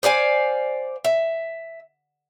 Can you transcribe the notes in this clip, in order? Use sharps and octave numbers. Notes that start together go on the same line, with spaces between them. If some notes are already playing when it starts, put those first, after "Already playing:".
C5 D5 F5 G#5
E5